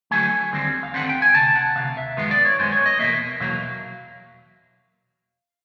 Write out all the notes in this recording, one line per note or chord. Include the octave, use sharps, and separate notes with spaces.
D3 F#3 A3 G#5
D#2 D3 G3 C4
F5
D#2 D3 G3 C4 F#5
G5
G#5
D2 C3 A5
F#5
D2 C3 F5
E5
F#2 D#3 G#3 B3
D5
C#5
F#2 D#3 G#3 B3 C5
C#5
D#5
E2 B2 F#3 A#3 E5
E2 B2 F#3 A#3 F5